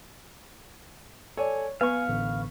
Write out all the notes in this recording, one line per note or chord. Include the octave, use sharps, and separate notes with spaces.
A4 C#5 D5 G#5
B3 F5 G#5 C#6
A1 D3